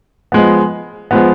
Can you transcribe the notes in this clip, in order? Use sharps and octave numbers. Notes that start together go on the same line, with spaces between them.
F3 G#3 B3
F3 G#3 B3